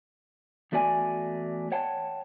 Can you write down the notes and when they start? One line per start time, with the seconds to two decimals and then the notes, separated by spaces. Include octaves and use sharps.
0.72 E2 A3 F#4 D5 G#5
1.72 C#5 F#5 G5 A5